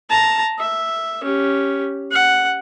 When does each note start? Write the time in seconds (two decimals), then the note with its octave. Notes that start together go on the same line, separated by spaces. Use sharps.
0.10 A5 A#5
0.59 E5
1.24 C#4 G4
2.12 F#5